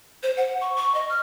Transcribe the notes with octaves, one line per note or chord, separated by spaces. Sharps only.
C5
F#5
C#6
C#6
D#5
F6